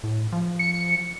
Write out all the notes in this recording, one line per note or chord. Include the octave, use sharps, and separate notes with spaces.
A2
F3
C#7